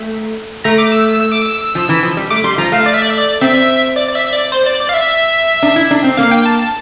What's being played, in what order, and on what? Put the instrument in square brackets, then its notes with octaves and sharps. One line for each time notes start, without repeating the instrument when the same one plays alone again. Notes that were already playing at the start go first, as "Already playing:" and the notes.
Already playing: [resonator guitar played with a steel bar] A3
[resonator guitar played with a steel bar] A3 [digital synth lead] A#5
[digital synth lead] D6
E6
E6
E6
D6
E6
[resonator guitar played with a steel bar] F3
E3
F3
G3
[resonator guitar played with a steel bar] A3 [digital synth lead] D6
[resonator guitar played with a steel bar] G3 [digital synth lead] C6
[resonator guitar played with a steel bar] F3 [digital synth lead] A#5
[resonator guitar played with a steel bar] A3 [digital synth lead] F5
[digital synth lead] D5
E5
D5
E5
D5
[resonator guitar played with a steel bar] C4 [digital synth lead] E5
[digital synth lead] D5
D5
E5
E5
D5
C5
D5
D5
F5
E5
[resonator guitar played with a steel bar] D4
E4
D4
C4
[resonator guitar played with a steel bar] A#3 [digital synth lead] F5
[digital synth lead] G5
A5
A5